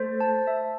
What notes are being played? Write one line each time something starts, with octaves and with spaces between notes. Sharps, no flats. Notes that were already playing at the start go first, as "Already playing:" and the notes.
Already playing: A3 C5
A5
E5